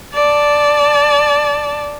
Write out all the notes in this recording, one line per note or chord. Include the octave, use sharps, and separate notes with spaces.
D5 A5